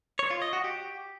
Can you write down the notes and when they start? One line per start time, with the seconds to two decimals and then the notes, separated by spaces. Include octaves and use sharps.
0.19 C#5
0.30 F4
0.42 D#5
0.53 F#4
0.64 G4